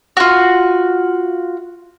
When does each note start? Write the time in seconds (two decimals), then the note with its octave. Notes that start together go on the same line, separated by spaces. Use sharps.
0.17 F4 F#4